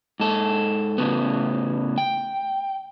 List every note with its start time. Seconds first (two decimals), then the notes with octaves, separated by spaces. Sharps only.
0.20 G#2 A4
0.98 A2 C#3 B3
1.98 G5